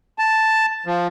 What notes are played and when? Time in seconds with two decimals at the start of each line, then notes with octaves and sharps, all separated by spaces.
0.19 A5
0.86 F3